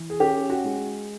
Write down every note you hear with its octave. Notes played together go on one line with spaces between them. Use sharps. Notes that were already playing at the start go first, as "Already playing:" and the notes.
Already playing: E3
G#4
C#4 G4
F#4
G#3